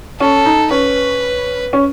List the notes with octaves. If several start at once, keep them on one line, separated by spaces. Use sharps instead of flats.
C#4 A4
D#4
C#4 B4
C#4